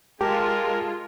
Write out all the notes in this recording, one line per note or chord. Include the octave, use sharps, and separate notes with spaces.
G#3 F4 G4 A#4 A5